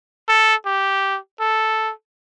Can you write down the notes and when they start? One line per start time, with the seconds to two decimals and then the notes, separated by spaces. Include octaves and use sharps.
0.29 A4
0.66 G4
1.40 A4